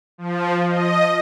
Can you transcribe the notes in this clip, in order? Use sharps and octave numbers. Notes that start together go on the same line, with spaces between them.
F3
D#5